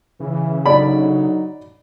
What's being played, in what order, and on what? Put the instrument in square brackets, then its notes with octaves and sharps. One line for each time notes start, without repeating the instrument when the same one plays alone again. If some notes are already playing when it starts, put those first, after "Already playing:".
[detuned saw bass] C#3 [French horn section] E3
[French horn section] D3 F#3 D#4 [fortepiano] D5 B5